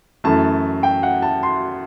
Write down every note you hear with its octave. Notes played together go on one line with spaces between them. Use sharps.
F#2 E3 A3 A5
G5
F#5
A5
C6